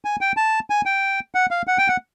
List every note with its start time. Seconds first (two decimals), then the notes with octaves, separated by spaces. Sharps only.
0.05 G#5
0.21 G5
0.37 A5
0.70 G#5
0.86 G5
1.35 F#5
1.51 F5
1.67 F#5
1.78 G5
1.88 F#5